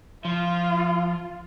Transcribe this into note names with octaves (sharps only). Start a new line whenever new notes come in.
F3 F4